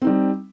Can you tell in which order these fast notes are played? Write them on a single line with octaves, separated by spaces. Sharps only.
C4 D#4 G3